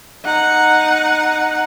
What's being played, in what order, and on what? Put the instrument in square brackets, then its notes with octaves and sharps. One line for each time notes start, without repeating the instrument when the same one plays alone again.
[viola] D#4 F#5